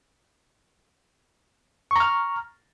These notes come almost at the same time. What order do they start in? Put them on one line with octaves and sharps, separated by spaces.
C#6 A#5 F6